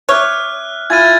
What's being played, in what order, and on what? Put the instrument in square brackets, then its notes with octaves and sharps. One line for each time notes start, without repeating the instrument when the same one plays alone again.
[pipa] C#5 [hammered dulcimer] E5 D6 [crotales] F6 F#6
[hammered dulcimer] E4 F4 G#5 [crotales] G#6 A6 D#7